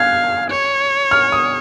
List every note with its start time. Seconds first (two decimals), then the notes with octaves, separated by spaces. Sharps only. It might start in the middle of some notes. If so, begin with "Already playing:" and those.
Already playing: F5 F#6 G#6
0.50 C#5
1.11 F6
1.32 D#6